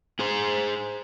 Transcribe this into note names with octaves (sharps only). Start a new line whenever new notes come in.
G#4 C5